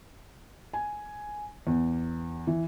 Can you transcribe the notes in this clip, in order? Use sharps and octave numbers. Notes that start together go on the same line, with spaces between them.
G#5
E2
E3